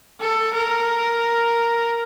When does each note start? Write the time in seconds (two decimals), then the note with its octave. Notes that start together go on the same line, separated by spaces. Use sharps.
0.21 A4
0.54 A#4